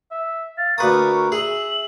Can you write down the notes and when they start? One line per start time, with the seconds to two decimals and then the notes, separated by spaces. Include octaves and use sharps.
0.11 E5
0.58 F5 A6
0.78 D2 A#4 B4 C#6 D#6
1.32 G#4 E5 F#7